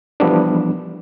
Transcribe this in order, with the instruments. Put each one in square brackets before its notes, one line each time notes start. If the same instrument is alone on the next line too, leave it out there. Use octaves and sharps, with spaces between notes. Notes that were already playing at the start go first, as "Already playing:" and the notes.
[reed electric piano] E3 F3 G3 B3 D4